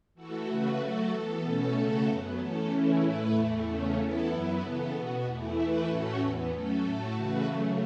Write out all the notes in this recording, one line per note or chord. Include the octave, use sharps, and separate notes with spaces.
E3 A3 F#4 A4
C#3 A3 F#4 B4
F#3 A3 F#4 A4
E3 B3 A4
B2 A3 C#4 A4
C#3 A3 F#4 A4
F#2 F#3 B3
E3 A3 C#4 A4
C#3 E3 A3 C#4 E4
A2 A3 E4 B4
E2 E3 A3
E2 C#3 A3 C#4
E3 B3 E4 A4
F#2 F#3 B3 E4
C#3 E3 B3 A4
B2 B3 F#4
E2 E3 A3 E4
E3 A3 E4 B4
A2 A3 C#4 F#4 A4
E2 E3 B3
F#3 A3 C#4 A4
A2 A3 F#4 A4
C#3 E3 A3 F#4 B4
C#3 F#3 A3